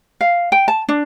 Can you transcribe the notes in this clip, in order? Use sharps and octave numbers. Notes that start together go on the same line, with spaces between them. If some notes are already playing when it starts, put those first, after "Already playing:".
F5
G5
A5
D4